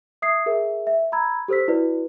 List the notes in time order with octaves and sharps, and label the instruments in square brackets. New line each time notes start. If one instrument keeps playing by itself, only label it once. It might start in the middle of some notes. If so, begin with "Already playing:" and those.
[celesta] E5 D#6 G#6 C7
G#4 A#4 E5
E5
A#5 B5 E6 G#6
G4 A4 C5 E6 B6
E4 F#4 B4 D5